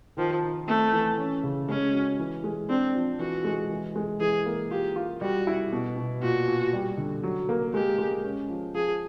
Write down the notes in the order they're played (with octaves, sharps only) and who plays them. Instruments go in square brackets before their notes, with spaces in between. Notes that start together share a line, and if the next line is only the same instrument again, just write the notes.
[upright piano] D#3 [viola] F3
[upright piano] D#4
[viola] A3 [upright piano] C4
[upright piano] E3
C#4
C#3
[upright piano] G#3 [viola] C#4
[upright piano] F#4
E3
G#3
[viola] C4 [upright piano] D4
[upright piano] F3
[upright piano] E3 [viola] F#4
[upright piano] G#3
E3
G#3
[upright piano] E3 [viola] G#4
[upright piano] A#3
[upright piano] F4 [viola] G4
[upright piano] F4
[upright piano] G3 [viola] F#4
[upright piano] E4
B2
B2
[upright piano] A#2 [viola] F#4
[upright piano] A#2
G3
D3
F#3
A#3
[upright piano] G#3 [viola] G4
[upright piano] G#3
C#4
F3
[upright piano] F3 [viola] G#4